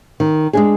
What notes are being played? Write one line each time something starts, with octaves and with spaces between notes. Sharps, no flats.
D#3
G#3 D4 G#4